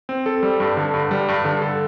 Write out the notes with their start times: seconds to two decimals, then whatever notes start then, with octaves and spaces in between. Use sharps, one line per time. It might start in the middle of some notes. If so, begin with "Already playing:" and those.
0.09 C4
0.26 A4
0.43 G3
0.60 G2
0.77 D3
0.94 G2
1.11 G3
1.28 G2
1.45 D3
1.62 A4